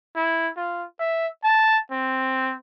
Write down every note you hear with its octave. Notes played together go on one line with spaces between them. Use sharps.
E4
F4
E5
A5
C4